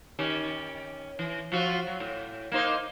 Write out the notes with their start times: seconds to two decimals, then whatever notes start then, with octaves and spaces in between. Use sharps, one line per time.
0.19 D#3 C#4 G4
1.19 E3
1.52 F3 F4 F#4
1.87 F#3
2.00 A2
2.52 A#3 D#4 C5